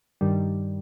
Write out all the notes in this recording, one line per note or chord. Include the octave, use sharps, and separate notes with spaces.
G2 D#3 G3